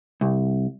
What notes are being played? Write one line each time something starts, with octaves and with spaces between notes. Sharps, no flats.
C2